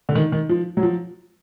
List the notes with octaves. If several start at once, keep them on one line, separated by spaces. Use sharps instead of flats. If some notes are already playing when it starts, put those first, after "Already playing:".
D3
D#3
D#3
F3
F#3
F3